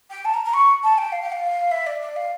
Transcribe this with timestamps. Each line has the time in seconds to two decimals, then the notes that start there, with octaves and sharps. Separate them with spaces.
0.10 G5
0.25 A5
0.34 A#5
0.44 A#5
0.53 C#6
0.83 A5
0.98 G5
1.12 F5
1.22 G5
1.32 F5
1.71 E5
1.86 D5
2.01 D5
2.16 F5